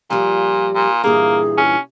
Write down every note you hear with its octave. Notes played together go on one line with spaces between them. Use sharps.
A#2 F3 G3
A#2
G2 A#2 E3 A#3 G#4
C#4